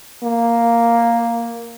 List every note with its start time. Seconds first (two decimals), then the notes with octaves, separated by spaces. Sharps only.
0.23 A#3